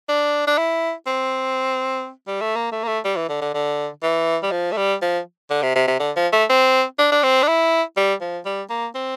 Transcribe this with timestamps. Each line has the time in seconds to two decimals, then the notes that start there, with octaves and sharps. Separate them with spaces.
0.09 D4
0.47 D4
0.58 E4
1.07 C4
2.28 G3
2.41 A3
2.56 A#3
2.72 A3
2.84 A#3
2.88 A3
3.05 G3
3.17 E3
3.29 D3
3.41 D3
3.54 D3
4.03 E3
4.43 G3
4.51 F3
4.72 A3
4.77 G3
5.02 F3
5.50 D3
5.62 C3
5.75 C3
5.88 C3
6.00 D3
6.16 F3
6.33 A3
6.49 C4
6.99 D4
7.11 D4
7.23 C4
7.43 D4
7.48 E4
7.97 G3
8.21 F3
8.45 G3
8.70 A#3
8.95 C4